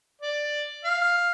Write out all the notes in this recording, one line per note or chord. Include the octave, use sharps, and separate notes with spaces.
D5
F5